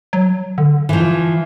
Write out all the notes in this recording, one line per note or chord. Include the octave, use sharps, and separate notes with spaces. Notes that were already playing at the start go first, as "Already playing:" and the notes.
F#3
D3
E3 F3